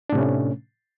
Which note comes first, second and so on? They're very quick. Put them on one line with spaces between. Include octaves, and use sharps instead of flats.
D4 A2 C3 C#4 A3